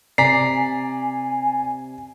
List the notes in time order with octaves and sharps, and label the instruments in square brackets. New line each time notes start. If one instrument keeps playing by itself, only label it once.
[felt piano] C3 [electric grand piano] D5 A#5 B6 [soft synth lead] G#5 [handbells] C7